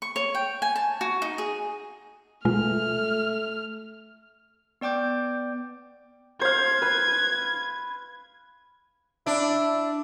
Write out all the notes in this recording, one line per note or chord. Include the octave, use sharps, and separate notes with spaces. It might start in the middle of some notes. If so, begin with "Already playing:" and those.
C#6
C#5
G5
G#5
A5
F#4
D#4
G#4
B2 G#3 A3 F4 F6
B3 D5 G5 D6 G6
C5 F5 G#6
B4
D4 E4